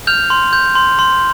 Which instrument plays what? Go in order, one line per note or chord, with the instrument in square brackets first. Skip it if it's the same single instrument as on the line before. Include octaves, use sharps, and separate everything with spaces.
[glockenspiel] F6 G6 F7
C6
G6
C6
C6